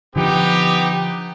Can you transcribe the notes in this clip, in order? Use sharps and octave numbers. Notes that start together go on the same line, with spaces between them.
D3 F3 B3 D#4 G4